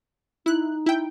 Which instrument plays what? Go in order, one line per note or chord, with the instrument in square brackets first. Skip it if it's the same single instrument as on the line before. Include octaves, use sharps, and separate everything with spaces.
[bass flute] D#4 [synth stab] E4 F#6
[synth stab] E4 G5